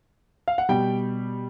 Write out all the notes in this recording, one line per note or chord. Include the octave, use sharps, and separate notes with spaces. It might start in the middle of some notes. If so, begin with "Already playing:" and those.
F5
F#5
B2 G3 G5